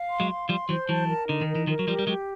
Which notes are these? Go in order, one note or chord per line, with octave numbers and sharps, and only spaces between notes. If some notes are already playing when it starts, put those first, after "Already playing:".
Already playing: F5
C6
F#3 G#3
F5
F3 G3 C6
E3 F#3 C5
E3 F#3 A5
A#4
D3 D#4
D#3
A#4
E3
D#3 F3 A#4
F#3
F3 G3 G4
G3
F#3 G#3 G4